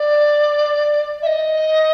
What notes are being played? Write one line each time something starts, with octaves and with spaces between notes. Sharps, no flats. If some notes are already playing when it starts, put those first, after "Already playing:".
Already playing: D5
E5
D#5